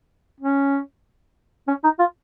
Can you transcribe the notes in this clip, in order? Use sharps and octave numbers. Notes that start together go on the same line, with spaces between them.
C#4
C#4
D#4
F4